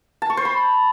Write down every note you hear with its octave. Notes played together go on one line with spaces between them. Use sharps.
A5
C#6
C5
B5